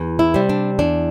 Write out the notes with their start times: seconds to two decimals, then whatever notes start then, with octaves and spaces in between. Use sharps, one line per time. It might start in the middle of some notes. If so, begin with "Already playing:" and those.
Already playing: E2
0.19 E4
0.34 C3 G3
0.49 D4
0.79 E2 D4